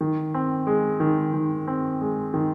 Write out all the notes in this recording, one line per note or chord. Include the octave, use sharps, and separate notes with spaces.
D#3
C4
G#3
D#3
D#3
C4
G#3
D#3